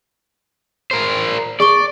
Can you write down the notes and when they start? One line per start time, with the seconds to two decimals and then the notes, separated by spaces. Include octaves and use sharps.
0.91 A#4 C5
1.60 G#4 D5 C#6 G7